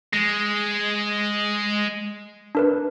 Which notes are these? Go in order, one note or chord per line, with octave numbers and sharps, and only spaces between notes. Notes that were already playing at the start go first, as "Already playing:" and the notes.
G#3 A#6
D4 A#4 B4